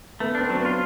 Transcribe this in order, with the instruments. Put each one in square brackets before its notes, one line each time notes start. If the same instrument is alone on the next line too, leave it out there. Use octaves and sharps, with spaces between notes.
[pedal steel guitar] A3 [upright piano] B3
[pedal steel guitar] D4
[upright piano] C4
[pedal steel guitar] F#3
[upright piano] B3
[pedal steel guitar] F4